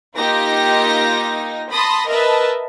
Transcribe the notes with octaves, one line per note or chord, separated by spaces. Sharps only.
A#3 D#4 F4 G4 A#6
A5 B5 C6 D#6 A#6
A#4 B4 D#5 E5 A5